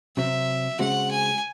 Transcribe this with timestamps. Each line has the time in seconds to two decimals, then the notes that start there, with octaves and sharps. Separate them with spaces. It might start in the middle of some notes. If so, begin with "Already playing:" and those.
0.17 C3 F#3 C4 E5
0.79 C#3 G#3 C4 F#4 F#5
1.11 G#5